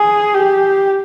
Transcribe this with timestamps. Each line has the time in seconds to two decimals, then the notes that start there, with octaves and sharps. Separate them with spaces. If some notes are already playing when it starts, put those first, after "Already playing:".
Already playing: G#4
0.34 G4